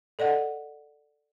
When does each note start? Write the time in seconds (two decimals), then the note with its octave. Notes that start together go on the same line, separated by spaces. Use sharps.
0.19 A4 D5 D#5 F#5